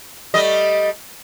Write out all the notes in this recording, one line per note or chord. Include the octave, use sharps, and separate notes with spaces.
G3 A3 D#5